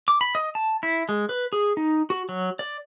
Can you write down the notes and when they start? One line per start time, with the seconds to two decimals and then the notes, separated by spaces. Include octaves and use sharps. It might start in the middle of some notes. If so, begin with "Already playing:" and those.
0.08 D6
0.21 B5
0.35 D#5
0.55 A5
0.83 E4
1.09 G#3
1.29 B4
1.53 G#4
1.77 D#4
2.10 F#4
2.29 F#3
2.59 D5